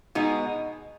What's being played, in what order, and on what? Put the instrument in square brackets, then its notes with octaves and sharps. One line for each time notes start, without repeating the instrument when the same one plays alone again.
[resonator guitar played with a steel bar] B2 G#3 D#4